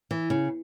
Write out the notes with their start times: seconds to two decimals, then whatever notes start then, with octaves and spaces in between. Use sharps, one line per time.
0.11 E3
0.30 C#3